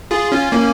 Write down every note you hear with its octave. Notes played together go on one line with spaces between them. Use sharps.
F4 G#4
C#4 F4
A#3 C#4